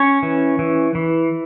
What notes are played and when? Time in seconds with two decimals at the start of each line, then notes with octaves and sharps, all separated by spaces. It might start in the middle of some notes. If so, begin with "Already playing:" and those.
Already playing: C#4 C#5
0.23 E3
0.59 E3
0.95 E3